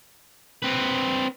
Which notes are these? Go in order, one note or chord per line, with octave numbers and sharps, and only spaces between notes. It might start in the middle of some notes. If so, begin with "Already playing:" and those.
C4 B4